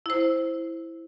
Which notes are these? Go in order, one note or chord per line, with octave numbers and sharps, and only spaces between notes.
E4 C5